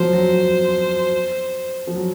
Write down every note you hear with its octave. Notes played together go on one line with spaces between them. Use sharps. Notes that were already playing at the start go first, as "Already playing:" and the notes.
Already playing: F3 F#3 C5
F#3
F#3
F3
F#3